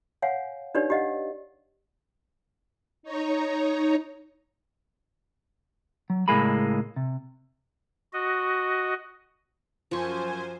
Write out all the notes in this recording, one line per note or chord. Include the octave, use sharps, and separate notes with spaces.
C#5 F5 F#5 G#5
D4 D#4 G4 B4 C#5 D5
G4 D5 D#5 F5 F#5
D#4 C#5 A#5
F#3
C#2 A2 G#3 A#3 G#4 B5
C3
F#4 D#5
F#2 F3 C5 G#5 C#6